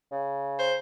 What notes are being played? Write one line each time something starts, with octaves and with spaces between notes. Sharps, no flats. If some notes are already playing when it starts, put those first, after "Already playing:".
C#3
C5